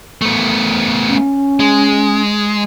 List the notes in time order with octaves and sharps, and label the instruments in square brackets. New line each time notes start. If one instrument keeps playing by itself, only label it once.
[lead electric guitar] A3 B3
[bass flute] C#4
[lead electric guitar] G#3